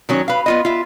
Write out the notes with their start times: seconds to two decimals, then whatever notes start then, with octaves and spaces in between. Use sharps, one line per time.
0.09 D#3 F#3 C#4
0.28 B4 F5
0.46 B3 F4 D#5
0.65 F4 E5